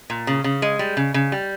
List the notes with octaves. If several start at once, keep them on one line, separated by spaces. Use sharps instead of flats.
A#2
C#3
C#3
G#3
G3
C#3
C#3
G3